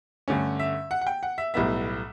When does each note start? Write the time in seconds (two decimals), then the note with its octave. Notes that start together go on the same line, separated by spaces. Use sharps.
0.28 G2 D3 A3 C#4
0.60 E5
0.91 F#5
1.01 F#5
1.07 G5
1.23 F#5
1.38 E5
1.54 B1 A2 G3 B3 E5